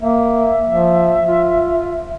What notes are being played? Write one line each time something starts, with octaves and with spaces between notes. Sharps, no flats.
A#3 E5
F3
F4